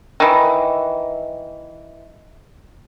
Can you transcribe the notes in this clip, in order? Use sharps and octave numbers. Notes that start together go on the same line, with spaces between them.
D#3 E3